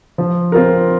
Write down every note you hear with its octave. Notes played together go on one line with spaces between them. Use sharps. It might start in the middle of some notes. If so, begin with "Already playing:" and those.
F3
C4 F4 A#4